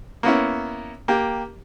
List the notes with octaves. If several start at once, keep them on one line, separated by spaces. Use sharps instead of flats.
A#3 B3 C#4 E4
A#3 G4